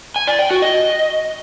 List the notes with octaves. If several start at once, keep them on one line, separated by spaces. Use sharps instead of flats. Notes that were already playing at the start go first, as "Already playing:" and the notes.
G#5
D5
G5
F#4
D#5